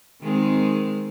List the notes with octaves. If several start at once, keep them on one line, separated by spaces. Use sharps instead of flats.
D#3 G#3 C4